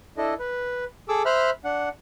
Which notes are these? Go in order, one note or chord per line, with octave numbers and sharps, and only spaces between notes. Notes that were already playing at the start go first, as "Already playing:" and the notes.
D4 E4 A4 D#5
B4
G#4 A4 D6 E6
C5 E5 B5 F6 F#6
D4 F#5